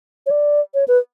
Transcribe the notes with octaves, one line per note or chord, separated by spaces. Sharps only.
C#5
D5
C#5
B4